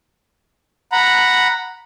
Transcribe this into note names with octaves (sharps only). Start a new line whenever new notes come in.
F#5 A#5 B5